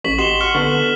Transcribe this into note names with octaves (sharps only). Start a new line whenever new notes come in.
A1 C#6 B6 F#7
F#4 G4 D#5 C6 E7 G7
F#5 C#6 F6
D3 B3 D4 A4 B4